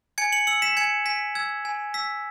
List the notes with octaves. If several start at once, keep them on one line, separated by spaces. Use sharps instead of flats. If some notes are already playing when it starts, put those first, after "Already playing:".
G#5 G#6 C#7
C#7 F#7
E6 C#7 F#7
B6 E7
G#5 G#6 C#7
G#5 B6
E6 G#6
G#5
E6 B6